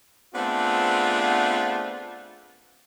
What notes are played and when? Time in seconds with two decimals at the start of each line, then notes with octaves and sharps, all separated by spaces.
0.35 A3 B3 C4 D4 F4 G#4